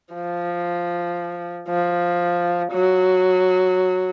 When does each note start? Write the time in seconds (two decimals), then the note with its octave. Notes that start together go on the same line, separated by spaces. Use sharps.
0.14 F3
1.69 F3
2.72 F#3